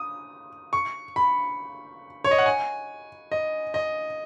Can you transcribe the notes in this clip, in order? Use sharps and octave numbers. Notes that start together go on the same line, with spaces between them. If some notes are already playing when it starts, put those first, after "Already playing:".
Already playing: D#6
C#6
B5
C#5
D#5
F#5
G#5
D#5
D#5